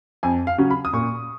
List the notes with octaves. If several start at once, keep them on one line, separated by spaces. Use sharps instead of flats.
F2 G#5
F5
C#3 F#3 C#4
B5
D#6
A#2 C#6